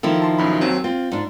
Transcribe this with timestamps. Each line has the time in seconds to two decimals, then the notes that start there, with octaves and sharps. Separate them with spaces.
0.03 D#3 F3 E4 A4
0.22 A5 C6
0.38 B1 F#2 B5
0.61 D#2 F#3 C4
0.84 C4 F4
1.12 G#2 D4